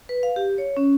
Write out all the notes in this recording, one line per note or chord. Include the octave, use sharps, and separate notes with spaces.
B4
F5
G4
C#5
C#4